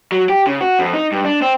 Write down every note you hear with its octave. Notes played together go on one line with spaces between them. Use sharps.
F#3
G4
C#3
F#4
F2
D#4
G2
D4
C4